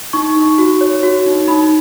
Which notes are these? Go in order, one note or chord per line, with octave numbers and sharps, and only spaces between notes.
D#4 C#6
D#4
F#4
C#5
F#4
D#4
D#4 B5